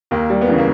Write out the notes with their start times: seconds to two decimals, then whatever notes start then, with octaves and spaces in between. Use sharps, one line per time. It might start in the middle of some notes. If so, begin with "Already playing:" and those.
0.11 D#2 A#3
0.30 G3
0.41 B3
0.47 C#3 E3 A#3
0.58 A#3